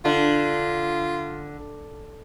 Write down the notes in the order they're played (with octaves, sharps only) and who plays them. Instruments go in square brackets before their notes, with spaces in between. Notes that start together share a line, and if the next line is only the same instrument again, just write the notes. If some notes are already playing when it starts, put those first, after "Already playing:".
[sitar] D3 [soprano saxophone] F4